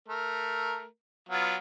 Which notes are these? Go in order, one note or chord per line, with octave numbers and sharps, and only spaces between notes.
A3 A#4
F#3 B3 F4